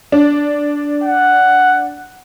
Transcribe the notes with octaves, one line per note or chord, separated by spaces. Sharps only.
D4
F#5